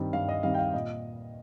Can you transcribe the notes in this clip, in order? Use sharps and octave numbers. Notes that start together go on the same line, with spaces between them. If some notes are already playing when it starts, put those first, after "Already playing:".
Already playing: G2 D#3 G3 C4
G2 F5
D#5
D#3 G3 C4 F5
G5
F5
A#2 D#5